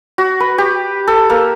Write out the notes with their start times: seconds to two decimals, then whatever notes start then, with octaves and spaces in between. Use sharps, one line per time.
0.18 F#4
0.40 B4
0.58 G4
1.08 A4
1.30 A#3